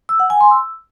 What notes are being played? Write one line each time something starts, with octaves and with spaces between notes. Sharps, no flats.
E6
F#5
G#5
C6
E6